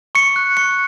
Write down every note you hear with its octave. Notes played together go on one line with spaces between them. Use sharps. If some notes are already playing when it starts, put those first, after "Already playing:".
C#6 C#7
F#6
C#6 C#7